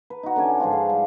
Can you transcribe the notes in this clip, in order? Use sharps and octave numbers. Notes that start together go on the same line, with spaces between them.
B4
D#4 F#4
D3 C#4 D5 G#5
G#2 F3 D4 F4
F5
G3